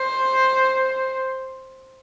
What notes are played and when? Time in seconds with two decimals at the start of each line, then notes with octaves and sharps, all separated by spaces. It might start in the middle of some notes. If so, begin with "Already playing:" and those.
Already playing: C5